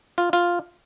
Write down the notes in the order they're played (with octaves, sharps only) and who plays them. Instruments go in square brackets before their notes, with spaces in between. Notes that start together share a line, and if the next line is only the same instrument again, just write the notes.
[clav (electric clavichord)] F4
F4